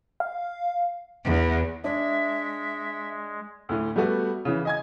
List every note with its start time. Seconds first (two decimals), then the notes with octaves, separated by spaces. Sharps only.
0.20 F5
1.25 E2
1.84 G#3 D4 E5
3.69 D2 A2
3.96 G3 A3 B3 F#4
4.45 C#3 E3
4.65 D#5 G#5 G#6